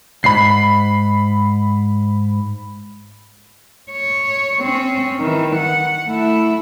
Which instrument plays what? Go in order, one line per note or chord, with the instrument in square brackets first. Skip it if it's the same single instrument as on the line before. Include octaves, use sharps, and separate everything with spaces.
[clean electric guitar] D2 G#2 [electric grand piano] B5 C7
[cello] C#5
C4 C#4
D#3 E3
F#5
A3 E4